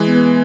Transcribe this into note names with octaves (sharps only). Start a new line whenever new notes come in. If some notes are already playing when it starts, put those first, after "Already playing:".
Already playing: E3 G#3
B3